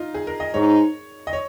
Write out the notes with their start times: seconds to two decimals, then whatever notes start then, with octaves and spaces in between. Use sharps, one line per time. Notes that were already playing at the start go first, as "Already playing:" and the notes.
Already playing: D#4 F4
0.14 G#4
0.27 A#4
0.40 D#5
0.54 G#2 G#3 D#4 C#5
1.27 D#5
1.33 C#5